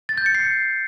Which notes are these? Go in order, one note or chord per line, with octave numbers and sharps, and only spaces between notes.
A6
G6
C#7
C7